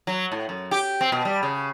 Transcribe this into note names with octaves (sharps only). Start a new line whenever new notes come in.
F#3
A2
F#2
G4
C4
B2
G3
C#3